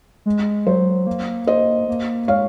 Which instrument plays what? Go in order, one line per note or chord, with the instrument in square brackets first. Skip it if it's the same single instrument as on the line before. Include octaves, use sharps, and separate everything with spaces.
[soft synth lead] G#3
[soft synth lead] F#3 [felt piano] C5
[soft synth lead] A#3
[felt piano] C5 D#5
[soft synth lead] A#3
[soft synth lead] G#3 [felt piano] C#5 F5